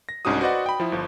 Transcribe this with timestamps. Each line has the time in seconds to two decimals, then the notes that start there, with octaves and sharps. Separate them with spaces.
0.09 A#6
0.25 C2 G#2 C#4 D4 F#4 D#6
0.41 F#4 B4 C5 D5 D#5 F#5
0.66 G5 B5
0.80 F3 E4
0.92 G1 F3